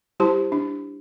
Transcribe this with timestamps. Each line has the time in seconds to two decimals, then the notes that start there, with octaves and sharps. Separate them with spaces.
0.20 G3 E4 G4 C5 A5 C6
0.52 D4